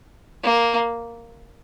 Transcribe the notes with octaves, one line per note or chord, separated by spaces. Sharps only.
A#3